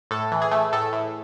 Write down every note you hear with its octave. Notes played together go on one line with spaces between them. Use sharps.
A2 A4
E3
G#4
A3
A2 A4
A2